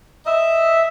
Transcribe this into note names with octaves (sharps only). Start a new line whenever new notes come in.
D#5 E5